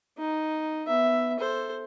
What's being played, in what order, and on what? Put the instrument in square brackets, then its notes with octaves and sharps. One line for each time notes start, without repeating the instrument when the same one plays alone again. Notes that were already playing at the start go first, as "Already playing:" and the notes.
[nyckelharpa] D#4
B3 E5
A4 C5